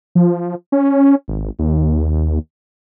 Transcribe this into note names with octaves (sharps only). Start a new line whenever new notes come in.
F3
C#4
G#1
D#2